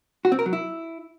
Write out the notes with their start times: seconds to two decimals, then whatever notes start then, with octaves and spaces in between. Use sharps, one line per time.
0.25 F#4
0.32 C4
0.39 A#4
0.46 F#3
0.53 E4